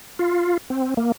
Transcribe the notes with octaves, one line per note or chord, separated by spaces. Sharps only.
F4
C4
A#3